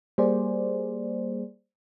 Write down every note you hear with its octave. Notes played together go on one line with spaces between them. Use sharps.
G3 A#3 G#4 C5 D5